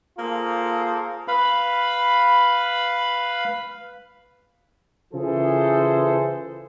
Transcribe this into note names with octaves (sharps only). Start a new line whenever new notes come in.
A#3 F4 G#4 A4 C5
B4 F5 B5
C#3 E3 F4 G#4 A4 C5